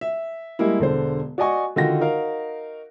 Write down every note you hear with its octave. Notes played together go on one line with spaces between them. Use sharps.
E5
G3 G#3 A#3 E4
E1 D3 C5
F#4 D5 D#5 G#5 C#6
D3 D#3 F4 F#4 G5 A#6
D#4 F#4 A#4 F5